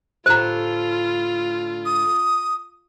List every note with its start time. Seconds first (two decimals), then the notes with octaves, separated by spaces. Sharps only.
0.26 A2 D3 F4 G4 C5 A#5
1.85 D#6